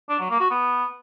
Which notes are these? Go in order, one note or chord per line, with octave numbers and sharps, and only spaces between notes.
D4
F#3
A#3
F#4
B3